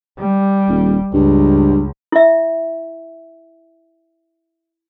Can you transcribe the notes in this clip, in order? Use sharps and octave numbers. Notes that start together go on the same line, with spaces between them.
G3
D#1
C#2 G2
E4 E5